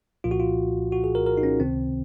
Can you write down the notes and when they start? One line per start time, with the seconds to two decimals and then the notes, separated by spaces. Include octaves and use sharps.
0.24 C2 A#2 F3 F4
0.31 F#4
0.40 F4
0.92 F#4
1.04 G#4
1.15 A#4
1.26 A#4
1.37 D#4
1.43 C#4
1.60 C#2 C3 D#3 C4